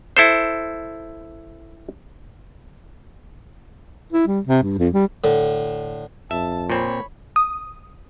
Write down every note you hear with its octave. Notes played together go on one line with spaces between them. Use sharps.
E4 A4 C5
E4
G3
C3
G2
F2
G3
A2 D3
F2 E5 A5
A#2 C4 C#5 B5
D#6